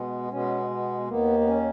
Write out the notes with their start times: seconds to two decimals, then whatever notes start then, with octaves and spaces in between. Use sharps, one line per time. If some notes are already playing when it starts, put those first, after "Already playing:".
Already playing: B2 G#3 B3
0.31 B2 G#3 B3 C#4
0.70 B3
1.08 D#2 D#3 A#3 B3
1.41 B3
1.47 C#4